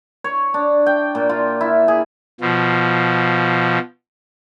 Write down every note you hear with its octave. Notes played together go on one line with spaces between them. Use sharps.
C#5
D4
G5
A#2
F4
E4
G#4
B2 F3